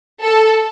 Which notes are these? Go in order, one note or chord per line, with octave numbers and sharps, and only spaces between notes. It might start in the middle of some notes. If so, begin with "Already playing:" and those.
A4